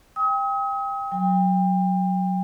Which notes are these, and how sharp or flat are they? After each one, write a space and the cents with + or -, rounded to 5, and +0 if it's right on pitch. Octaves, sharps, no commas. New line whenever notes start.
G5 +20 D#6 +40
F#3 +0 G5 +35